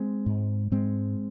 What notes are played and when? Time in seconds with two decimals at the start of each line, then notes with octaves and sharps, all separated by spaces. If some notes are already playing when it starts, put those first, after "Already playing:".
Already playing: G#3 C4
0.26 G#2
0.71 G#2 G#3 C4